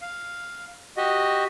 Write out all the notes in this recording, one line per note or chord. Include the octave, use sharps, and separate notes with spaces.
F5
F#4 G4 D#5